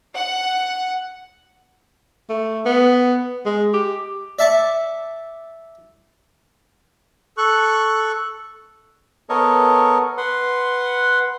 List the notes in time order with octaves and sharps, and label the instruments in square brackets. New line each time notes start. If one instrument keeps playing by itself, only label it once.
[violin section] F#5
[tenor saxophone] A3
B3
G#3
G4
[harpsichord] D5 E5 A5 C#6
[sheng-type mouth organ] A4 C#6 F#6
[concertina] B3 A4 A#4 C#5 D#5 C#6
B4 F#5 C6